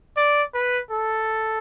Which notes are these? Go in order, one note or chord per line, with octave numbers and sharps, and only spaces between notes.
D5
B4
A4